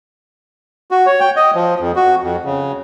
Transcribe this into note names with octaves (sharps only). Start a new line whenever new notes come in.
F#4
C#5
G5
D#5
F3
F2
F#4
F2
C#3